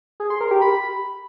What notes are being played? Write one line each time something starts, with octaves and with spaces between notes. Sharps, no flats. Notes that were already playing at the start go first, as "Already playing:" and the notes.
G#4
C6
A#4
G4
B5